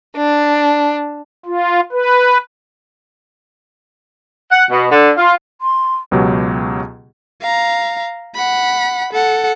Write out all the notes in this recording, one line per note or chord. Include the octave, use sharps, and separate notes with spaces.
D4
F4
B4
F#5
B2
D3
F4
C6
C#2 B2 F#3 G4
F5 A#5
F#5 B5
A4 F#5